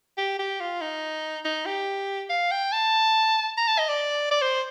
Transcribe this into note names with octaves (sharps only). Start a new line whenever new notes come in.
G4
G4
F4
D#4
D#4
G4
F5
G5
A5
A#5
A5
D#5
D5
D5
C5